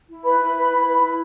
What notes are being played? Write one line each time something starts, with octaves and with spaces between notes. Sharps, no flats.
E4
B4 B5
E4
B4
E4
B4
E4